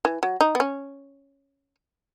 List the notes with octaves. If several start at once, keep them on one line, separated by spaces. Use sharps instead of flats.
E3
F#3
D#4
B3
C#4